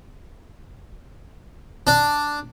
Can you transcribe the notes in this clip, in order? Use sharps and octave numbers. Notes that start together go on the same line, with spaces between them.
D4